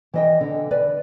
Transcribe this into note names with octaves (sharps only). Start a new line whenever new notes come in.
E3 D#5 G5
D3
B4 D5